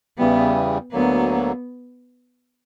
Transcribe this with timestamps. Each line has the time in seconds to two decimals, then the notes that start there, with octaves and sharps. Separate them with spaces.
0.18 E2 C#3 E3 G3 B3
0.92 D2 D3 F#3 A#3 B3